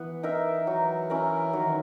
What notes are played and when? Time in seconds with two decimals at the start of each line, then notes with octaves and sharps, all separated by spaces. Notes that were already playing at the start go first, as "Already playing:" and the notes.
Already playing: E3 B3
0.23 D#4 A#4 E5
0.67 F#3
1.10 C#4 E4 A#4
1.53 D#3 F#3